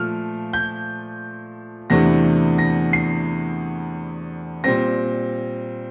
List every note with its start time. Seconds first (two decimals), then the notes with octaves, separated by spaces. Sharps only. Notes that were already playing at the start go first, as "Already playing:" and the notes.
Already playing: A#2 F3 A3 F6
0.53 G6
1.90 E2 C3 E3 A3 D4 A#6
2.58 A#6
2.93 C7
4.64 A#2 G3 C4 A#6